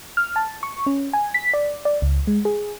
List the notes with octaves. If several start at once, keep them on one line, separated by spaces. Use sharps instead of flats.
F6
A5
C#6
C#4
G#5
B6
D5
D5
C#2
G#3
G#4